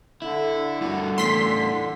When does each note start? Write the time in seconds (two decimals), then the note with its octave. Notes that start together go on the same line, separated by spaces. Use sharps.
0.22 D3 E4
0.81 G2 F#4
1.18 E2 A2 C6 B6